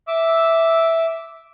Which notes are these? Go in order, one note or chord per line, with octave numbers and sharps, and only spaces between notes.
E5 D6 E6